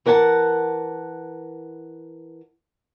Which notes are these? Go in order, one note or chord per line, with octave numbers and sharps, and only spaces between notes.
E3 A#4 F#5 G#5 A5